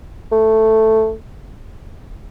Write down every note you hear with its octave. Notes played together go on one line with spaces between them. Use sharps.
A3